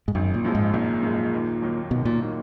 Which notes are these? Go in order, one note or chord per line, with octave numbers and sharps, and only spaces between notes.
G#2
G#1 F#2
A#2
F#2 F3 G#3
G#2
G#1 A#2
F#2 F3 G#3
D#2
D#3 F#3 A#3 D#4
D#2 B2
A#2
D#3 F#3 A#3 D#4